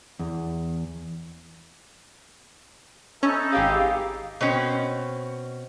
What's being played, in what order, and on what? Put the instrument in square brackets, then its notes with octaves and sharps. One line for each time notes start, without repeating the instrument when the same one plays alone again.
[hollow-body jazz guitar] E2
[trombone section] E3 D#4 A4 [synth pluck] C#4
[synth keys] G#1 G4 G#4 [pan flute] F5
[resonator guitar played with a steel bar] B2 C4 C#4